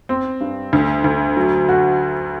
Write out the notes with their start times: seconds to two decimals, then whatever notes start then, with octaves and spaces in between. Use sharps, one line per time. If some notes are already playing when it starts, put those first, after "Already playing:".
0.09 C4
0.40 G2
0.73 D2
1.04 D2
1.37 F#3
1.69 F#4